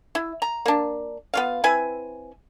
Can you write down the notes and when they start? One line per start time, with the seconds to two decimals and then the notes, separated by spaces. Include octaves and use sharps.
0.15 E4
0.42 A#5
0.66 A#3 D4
1.34 B3 F4 F5
1.64 C4 E4 B4 G#5